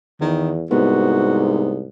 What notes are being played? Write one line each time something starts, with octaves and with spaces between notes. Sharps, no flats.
E2 D#3
C2 G#2 B3 F#4